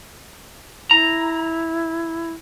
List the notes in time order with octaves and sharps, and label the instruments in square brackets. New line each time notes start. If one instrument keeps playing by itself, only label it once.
[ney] E4 [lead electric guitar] A#5